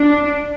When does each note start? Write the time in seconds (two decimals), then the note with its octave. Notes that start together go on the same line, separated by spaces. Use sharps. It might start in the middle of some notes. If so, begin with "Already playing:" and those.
Already playing: D4